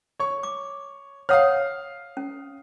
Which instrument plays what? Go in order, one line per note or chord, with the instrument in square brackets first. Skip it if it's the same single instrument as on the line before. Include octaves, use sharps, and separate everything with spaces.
[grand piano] C#5 C#6
[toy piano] D6
[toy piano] C#5 F#5 [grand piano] F5 D#6 F6
[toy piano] C#4